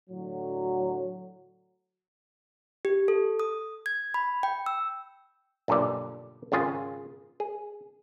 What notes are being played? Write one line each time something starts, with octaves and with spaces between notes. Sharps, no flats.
A2 D3 F#3
G4
A4
D#6
G#6
B5
G5
E6
B1 G2 A#2 D3 D5
G#1 C#3 F4 G#4
G#4